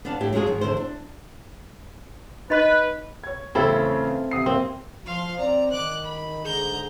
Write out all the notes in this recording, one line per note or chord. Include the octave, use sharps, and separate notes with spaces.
B3 D4 F5 F#5 A5
A2 E4 G4
F#3 G#3 D4 F4 G#4
G#2 D#3
E2 D3 E4 C5
D4
D#4 B4 D#5 B5
C#5 G#6
E2 A2 C#3 C4 E4 A4
C3 D#6 C7
C3 A#3 C4
F3 F5 C6
C4 D5 A#5
D#3 D6 F#6
B5
G#2 D3 G#4 A#5 G6